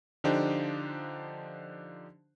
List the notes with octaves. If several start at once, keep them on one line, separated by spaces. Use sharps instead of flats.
D3 F3 D4 D#4 G4 C5